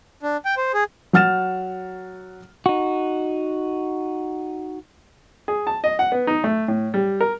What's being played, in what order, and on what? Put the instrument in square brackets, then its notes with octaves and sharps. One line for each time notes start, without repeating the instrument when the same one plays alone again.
[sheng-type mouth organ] D4
G5
C5
G#4
[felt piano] F#3 F#5 F6 A6 E7
[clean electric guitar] D#4 F#4
[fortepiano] G#4
A5
D#5
F#5
B3
D#4
A3
A2
G3
A#4